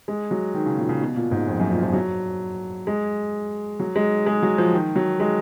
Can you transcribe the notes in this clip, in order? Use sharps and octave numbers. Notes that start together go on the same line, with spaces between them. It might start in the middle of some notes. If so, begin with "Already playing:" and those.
G#3
F#3
D#3
C#3
A#2
C#3
B2
A#2
G#2
F2
F#2
A#2
F3
F#3
G#3
F#3
G#3
G#3
F#3
F3
D#3
F#3
G#3